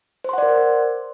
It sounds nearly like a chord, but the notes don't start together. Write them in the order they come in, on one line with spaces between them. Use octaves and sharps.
C5 C6 F#5 D5 A#4